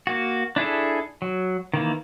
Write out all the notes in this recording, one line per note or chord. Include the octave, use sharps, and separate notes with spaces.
A#3 F#4
D4 E4 G#4 A4
F#3
D#3 E3 A#3